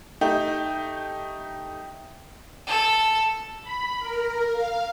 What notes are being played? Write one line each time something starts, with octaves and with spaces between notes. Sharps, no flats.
A3 D#4 G4
A4
B5
A#4
F5